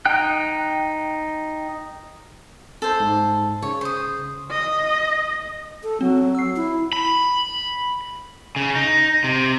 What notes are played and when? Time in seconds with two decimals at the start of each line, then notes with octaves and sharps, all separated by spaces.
0.05 D#4 G5 F#6
2.82 A4 C5
3.00 G#2
3.62 C#3 C#5
3.81 C5 D#6
4.50 D#5
5.83 A4
6.01 F#3 C4
6.35 E6 C7
6.56 E4
6.93 B5
8.56 C#3
8.76 D#4
9.24 C3